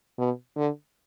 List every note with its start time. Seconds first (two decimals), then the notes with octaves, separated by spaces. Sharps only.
0.18 B2
0.57 D3